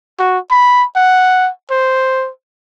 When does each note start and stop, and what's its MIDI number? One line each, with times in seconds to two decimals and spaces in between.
0.19 0.38 66
0.51 0.85 83
0.96 1.50 78
1.71 2.30 72